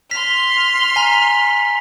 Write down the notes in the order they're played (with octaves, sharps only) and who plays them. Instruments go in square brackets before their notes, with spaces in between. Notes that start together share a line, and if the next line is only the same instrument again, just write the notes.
[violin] C6 F6 [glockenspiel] B6
[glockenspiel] G#5 A#5 B6